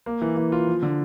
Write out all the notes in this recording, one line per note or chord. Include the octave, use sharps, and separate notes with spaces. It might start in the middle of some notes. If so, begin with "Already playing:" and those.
A#3
E3
E3
F4
F3
D3